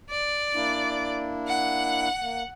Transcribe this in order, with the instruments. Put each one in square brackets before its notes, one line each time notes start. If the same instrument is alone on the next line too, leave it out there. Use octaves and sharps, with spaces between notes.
[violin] D5
[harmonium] A#3 D4 E4
[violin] F#5
[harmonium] A#3